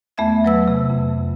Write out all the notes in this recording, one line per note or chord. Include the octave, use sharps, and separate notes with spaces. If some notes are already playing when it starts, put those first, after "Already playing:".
E2 A3 B3 E5 G#6
F#3 B4 E6
C3
F2